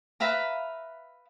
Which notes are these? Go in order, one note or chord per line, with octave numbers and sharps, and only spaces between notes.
B4 E5 F5 A#5